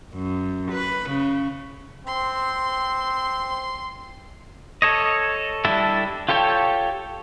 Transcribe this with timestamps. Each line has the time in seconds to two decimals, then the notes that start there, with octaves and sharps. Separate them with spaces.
0.14 F#2
0.71 B4
1.10 C#3
2.07 C4 C6
4.82 A4 C#5 D#5
5.65 G3 D4 E4 A4
6.29 F4 G4 A4 C#5 G5